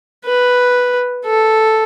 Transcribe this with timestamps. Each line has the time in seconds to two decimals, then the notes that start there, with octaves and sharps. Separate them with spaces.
0.25 B4
1.26 A4